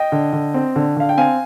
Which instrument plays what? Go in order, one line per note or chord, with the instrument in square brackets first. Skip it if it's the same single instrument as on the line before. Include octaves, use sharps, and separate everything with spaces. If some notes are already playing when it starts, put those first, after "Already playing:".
Already playing: [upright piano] D#5 G5
D3
D3
C4
D3
D3 F5
G5
C4 F5 G#5